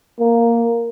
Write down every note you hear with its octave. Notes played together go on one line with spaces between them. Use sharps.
A#3